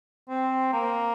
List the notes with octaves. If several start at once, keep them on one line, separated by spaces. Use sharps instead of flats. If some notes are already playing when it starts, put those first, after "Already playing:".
C4
A#3